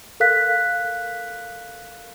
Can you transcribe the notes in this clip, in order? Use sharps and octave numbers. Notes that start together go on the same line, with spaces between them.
A4 A#4 F5 F#6 B6